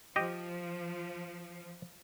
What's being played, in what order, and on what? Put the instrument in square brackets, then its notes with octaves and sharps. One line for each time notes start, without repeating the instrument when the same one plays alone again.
[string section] F3 [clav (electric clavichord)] G4 D#5